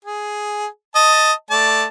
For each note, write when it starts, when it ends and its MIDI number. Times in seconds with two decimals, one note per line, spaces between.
0.04 0.66 68
0.95 1.32 75
0.95 1.32 81
1.50 1.85 57
1.50 1.85 74
1.50 1.85 81